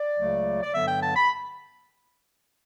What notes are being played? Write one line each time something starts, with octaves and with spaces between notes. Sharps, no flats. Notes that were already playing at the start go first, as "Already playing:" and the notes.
Already playing: D5
C#2 C#3 F#3 A3
D5
G2 D3 F#3 B3 E5
G5
A5
B5